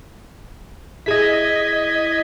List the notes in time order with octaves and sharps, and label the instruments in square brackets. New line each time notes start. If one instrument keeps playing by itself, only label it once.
[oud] E4 G#4 [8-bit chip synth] D#5 G#6 B6